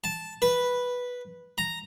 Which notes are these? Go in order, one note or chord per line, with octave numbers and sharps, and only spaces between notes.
A5
B4
A#5